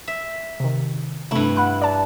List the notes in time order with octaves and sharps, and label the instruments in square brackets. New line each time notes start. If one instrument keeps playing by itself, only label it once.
[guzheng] E5
[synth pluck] C3 D#3
[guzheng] G2 E4 [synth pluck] C3 A3
[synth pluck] F#5 B5 F#6
D5 A5